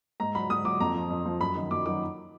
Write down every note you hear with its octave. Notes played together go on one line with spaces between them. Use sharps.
G#2 A#5
F#3 B5
G#2 D#6
F#3 D6
F2 A#5
F3
F2
F3
F#2 B5
D#3 F#3
F#2 D6
D#3 F#3 D6